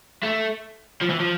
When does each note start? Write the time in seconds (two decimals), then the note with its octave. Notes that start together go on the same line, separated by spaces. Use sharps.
0.23 A3
1.01 F3
1.10 E3
1.20 F3